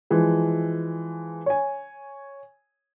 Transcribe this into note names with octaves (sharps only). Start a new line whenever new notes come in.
E3 F3 G#3
C#5 G#5